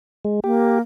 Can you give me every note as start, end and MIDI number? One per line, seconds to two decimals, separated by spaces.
0.25 0.40 56
0.44 0.81 58
0.44 0.79 67